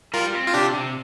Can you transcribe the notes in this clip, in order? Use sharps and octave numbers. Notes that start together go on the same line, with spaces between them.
G3 F4 A#4
C4
F4
C3 D4 G4
C3